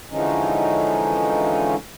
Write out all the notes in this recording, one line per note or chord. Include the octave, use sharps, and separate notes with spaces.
D3 E3 F3 G#3 C#4 D#4